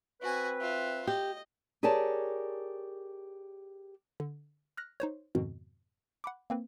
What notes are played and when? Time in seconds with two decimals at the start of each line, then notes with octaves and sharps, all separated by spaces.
0.22 C4 F#4 B4 G#5
0.61 F4 E5
1.07 G4 D#5
1.83 G4 G#4 A#4 C#5 D5 A5
4.20 D3
4.77 F6 F#6 A#6
5.00 D#4 C5 C#5
5.35 F2 G#2 B2 D#3
6.24 F#5 B5 D6
6.50 A#3 C4 B4